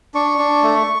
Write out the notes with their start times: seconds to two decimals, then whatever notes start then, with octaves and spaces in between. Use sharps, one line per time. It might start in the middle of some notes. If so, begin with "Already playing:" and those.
0.14 D4 C#6
0.39 D4
0.63 A3